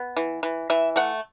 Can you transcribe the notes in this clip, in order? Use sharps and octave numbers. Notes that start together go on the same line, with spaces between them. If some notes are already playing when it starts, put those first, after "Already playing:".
Already playing: B3
E3
E3
E3 E5
A3 F#5